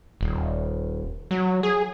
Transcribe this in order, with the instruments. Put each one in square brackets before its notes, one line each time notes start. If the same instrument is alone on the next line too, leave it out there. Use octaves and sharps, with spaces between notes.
[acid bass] D#1
F#3
G#4